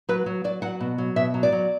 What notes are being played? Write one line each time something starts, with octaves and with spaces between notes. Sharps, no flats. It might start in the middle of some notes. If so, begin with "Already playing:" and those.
F#3 B4
F#3
F#3 D5
F#3 F#5
B2
F#3
B2 E5
F#3
D5
F#3